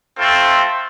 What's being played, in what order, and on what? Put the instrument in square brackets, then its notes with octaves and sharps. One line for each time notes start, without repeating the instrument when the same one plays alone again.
[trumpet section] A3 C4 F4 A4 C6